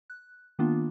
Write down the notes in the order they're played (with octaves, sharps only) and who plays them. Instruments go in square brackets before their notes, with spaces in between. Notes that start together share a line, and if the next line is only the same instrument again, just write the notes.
[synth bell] F#6
D#3 A#3 B3 D4 F4